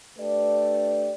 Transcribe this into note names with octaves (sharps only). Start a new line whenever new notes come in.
A3 D4 G4 B4 D5